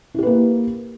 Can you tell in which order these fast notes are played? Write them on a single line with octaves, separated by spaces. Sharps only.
E4 G4 B4 A#3